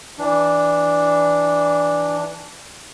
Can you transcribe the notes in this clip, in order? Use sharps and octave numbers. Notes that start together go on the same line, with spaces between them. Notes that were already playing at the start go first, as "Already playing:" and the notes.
E3 D4